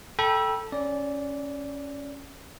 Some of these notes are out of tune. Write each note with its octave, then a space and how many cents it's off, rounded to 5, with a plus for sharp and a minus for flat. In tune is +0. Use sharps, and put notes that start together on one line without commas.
A4 +0 G5 +0 B5 -40
C#4 +0 D5 -15